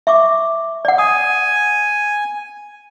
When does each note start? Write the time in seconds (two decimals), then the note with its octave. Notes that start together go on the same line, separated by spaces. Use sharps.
0.07 E5 C#6 D6
0.85 D5 F#5
0.98 G#5 D#6